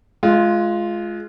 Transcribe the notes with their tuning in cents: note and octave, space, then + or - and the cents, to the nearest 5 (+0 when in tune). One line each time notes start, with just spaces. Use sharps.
G#3 +25 F4 -5